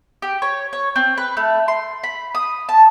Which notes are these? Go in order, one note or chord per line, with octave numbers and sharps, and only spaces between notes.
G4
C#5
C#5
C4
B4
A3
C6
B5
D#6
A5